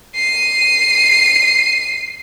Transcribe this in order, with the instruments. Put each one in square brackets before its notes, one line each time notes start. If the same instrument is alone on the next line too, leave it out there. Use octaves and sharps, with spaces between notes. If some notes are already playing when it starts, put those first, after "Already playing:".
[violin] C7 D#7